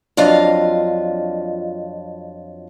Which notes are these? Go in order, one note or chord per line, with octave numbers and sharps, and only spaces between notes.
F2 F#3 D4 F4 D#5 F5